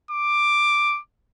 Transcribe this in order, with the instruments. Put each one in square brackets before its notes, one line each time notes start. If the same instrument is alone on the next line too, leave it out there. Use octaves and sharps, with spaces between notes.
[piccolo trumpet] D6